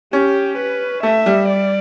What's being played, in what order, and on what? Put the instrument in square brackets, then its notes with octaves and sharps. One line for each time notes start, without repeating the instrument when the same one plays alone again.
[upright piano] C#4 [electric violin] G4
[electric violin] B4
[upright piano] A3 [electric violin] E5
[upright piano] G3
[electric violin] D5